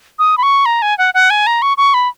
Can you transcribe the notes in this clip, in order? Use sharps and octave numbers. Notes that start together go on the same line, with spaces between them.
D#6
B5
C#6
A#5
G#5
F#5
F#5
G#5
A#5
C#6
C#6
B5